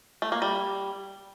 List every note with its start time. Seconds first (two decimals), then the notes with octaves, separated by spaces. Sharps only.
0.22 A3
0.32 A#3
0.42 G3